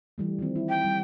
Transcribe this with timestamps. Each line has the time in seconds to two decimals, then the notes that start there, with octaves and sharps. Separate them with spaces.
0.18 E3 G3 A3
0.39 D#3 F3 C4
0.56 E4
0.69 G5
0.84 G3